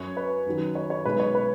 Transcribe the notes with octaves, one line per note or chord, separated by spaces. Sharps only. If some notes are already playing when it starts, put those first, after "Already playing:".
Already playing: F#2 F#3 C#5
B4
F#2 D#3 F#3
C#5
C#5
B1 B2 G#3 B4
C#5
B4